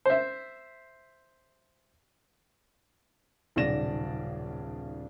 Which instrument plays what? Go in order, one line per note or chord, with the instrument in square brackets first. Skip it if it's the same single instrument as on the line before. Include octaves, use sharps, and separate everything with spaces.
[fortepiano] C5 E5
[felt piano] D#1 B1 C#3 D5 A#6 E7